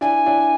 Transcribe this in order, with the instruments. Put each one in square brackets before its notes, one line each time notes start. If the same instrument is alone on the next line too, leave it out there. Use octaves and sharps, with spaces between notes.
[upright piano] D4 E4 [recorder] G#5
[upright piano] D4 E4